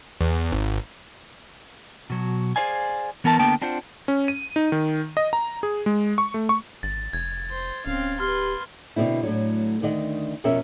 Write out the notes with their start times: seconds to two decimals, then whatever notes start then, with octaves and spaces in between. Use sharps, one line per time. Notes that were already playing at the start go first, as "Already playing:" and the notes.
0.21 E2
0.52 G#1
2.10 B2 F#3
2.56 G#4 A#4 C5 D5 F5 G#5
3.24 E3 B3 A#4 G#5 A5
3.39 D3 A#3 B3 G5 A5
3.62 C4 D4 F4 C5 F#5
4.08 C#4
4.28 D#7
4.56 D#4
4.72 D#3
5.17 D#5
5.33 A#5
5.63 G#4
5.86 G#3
6.18 C#6
6.34 A3
6.49 C#6
6.83 G#1 A6
7.13 F1 G#6
7.50 C5
7.86 D1 C4 C#4 F5
8.20 G4 B4 C6 F6
8.96 B2 D3 C4 E4
9.23 A2 F#3
9.82 D2 D#3 D#5 F#5
10.44 F2 B2 C#4 A#4 E5